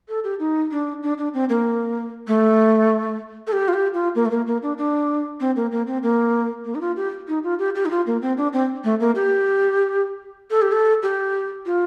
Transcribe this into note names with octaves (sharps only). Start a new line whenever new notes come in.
A4
G4
D#4
D4
D4
D4
C4
A#3
A3
A4
G4
F4
G4
F4
A#3
A3
A#3
A#3
D4
D4
C4
A#3
A#3
C4
A#3
A#3
D#4
F4
G4
D#4
F4
G4
G4
D#4
F4
A#3
C4
D4
C4
A3
A#3
G4
A4
G4
A4
G4
F4